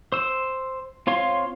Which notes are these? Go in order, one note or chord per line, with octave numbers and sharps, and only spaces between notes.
C5 E6
C4 F4 C#5 F5 C6